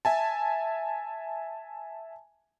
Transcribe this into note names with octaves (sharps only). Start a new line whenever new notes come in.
E5 G#5 A5